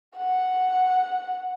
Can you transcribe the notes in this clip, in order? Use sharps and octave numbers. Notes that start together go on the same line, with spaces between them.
F#5